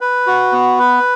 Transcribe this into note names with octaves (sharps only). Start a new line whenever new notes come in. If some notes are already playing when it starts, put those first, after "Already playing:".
B4
F#4
B3
B4